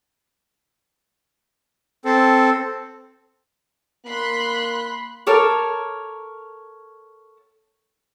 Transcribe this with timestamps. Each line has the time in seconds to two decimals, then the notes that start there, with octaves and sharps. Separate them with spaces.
2.05 C4 A4
4.06 A#3 B5 C6 F#6
5.27 A4 A#4 C#5 D6